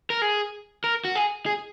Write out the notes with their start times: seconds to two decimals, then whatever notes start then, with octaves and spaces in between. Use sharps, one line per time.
0.10 A#4
0.22 G#4
0.84 A#4
1.05 F#4
1.15 G#4
1.46 G#4